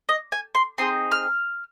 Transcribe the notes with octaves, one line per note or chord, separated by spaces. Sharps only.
D#5
G#5
C6
C4 D#4 G#4 C6
F6